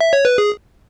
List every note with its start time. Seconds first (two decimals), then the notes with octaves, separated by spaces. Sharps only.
0.00 E5
0.13 C#5
0.25 B4
0.38 G#4